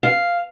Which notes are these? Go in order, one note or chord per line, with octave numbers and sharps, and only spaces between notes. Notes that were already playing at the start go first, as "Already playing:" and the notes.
F5